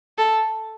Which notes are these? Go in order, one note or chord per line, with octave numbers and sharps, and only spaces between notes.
A4